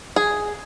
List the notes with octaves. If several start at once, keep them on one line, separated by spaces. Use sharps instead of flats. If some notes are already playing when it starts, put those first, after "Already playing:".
G#4